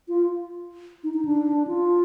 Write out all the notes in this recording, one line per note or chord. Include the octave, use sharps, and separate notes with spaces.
F4
D#4
D#4
D4
F4